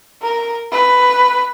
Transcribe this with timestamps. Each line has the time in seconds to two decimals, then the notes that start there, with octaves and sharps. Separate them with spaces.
0.22 A#4
0.72 B4